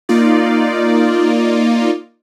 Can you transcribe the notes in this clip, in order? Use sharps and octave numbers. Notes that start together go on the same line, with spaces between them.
A#3 D#4 F4 D5